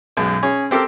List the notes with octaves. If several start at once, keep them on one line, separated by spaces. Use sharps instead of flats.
B1 F#2 G#3
C#4 G#4 C#5
C4 G4 A4 A#4